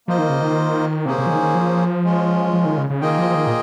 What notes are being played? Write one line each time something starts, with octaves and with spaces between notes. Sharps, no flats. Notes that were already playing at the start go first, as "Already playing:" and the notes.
F3 A#3 F4 C5 D#5
D#3
C#3
D#3
C3 A#3 C#4 G#4 C5
C3
F3
D#3
D#3
F3
G#3 C#4 F4
F3
D#3
C#3
C#3
D#3 A#3 F4 G#4 D#5 G5
F3
F3
D#3
A#2